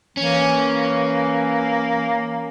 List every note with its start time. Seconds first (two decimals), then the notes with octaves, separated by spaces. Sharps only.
0.17 E3 A#3 C#4